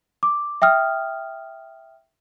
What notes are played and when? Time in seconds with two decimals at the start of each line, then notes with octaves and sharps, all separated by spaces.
0.23 D6
0.62 E5 G5 D#6 F6